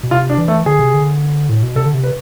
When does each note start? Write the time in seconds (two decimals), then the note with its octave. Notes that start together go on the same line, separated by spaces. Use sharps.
0.03 B2
0.11 C3 F4
0.30 D4
0.38 E3
0.48 A3
0.66 D3 G#4
0.79 C3
0.94 D3
1.49 A2
1.63 B2
1.76 C3 A4
1.86 D3
1.94 C3
2.04 B4